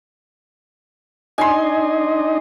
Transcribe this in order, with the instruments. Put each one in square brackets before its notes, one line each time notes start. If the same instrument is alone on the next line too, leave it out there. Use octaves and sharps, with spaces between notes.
[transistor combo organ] D4 D#4 D#5 [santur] G#5 C6